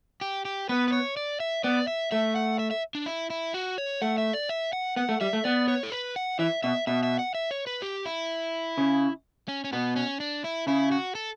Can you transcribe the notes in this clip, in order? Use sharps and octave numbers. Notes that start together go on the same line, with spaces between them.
G4
G4
B3 B4
B4
C#5
D5
E5
B3 D5
E5
A3 E5
F#5
E5
E5
D4
E4
E4
F#4
C#5
A3 F#5
E5
D5
E5
F#5
B3 F#5
A3
G3 E5
A3
B3 D5
C#5
A4
B4
F#5
E3 E5
B2 E5
B2 E5
E5
F#5
E5
C#5
B4
G4
E4
C#3
C#4
C#4
B2 B3
C#4
D4
E4
C#3 E4
F#4
A4